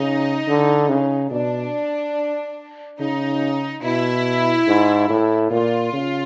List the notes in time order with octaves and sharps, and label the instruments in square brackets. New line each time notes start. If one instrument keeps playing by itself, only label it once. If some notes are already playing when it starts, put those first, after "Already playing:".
Already playing: [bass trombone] C#3 [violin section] D#4
[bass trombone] D3
C#3
[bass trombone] B2 [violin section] D4
[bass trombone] C#3 [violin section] D#4
[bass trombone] B2 [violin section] E4
[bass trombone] G#2
A2
[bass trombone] A#2 [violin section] F4
[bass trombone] C#3